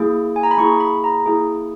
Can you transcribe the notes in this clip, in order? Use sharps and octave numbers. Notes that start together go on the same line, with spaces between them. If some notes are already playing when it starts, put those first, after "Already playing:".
Already playing: A#3 E4 G#4
G#5
A#5
B5
A#3 E4 G#4 C#6
B5
A#5
A#3 E4 G#4